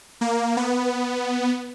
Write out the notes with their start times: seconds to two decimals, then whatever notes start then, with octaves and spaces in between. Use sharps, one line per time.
0.21 A#3
0.57 B3